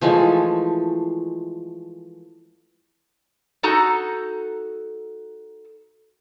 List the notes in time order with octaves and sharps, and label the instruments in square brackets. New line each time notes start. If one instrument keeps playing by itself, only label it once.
[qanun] E3 F3 G#3 A3
[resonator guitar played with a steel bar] D#4 F#4 A4 A#5